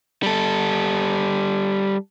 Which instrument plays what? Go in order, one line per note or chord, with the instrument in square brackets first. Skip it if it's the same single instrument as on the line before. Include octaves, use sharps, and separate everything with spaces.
[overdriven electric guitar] G3 A4